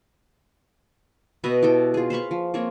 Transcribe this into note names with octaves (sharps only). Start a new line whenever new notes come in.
B2 D#5 E5 B5
E4 G4 A4 G5
F4 G#4
C5 F5 B5 C#6
F3
A#3 C4 F4 C#5